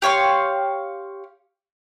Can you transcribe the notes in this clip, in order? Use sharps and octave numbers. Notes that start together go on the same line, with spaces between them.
G4 C#5 F5 C6